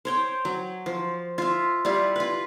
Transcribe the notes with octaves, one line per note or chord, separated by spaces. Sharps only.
C5 C#5 G5
F#3
F3
F4 E5
G3 E4 F4
F4 B4